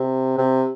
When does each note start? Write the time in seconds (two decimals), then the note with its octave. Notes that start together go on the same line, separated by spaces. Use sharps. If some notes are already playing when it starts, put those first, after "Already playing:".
Already playing: C3
0.38 C3